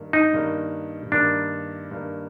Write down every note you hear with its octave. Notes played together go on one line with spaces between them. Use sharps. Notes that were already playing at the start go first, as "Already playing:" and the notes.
Already playing: G2 D#3 A#3
D#4
G2 D#3 A#3
G2 D#3 A#3 D4
G2 D#3 A#3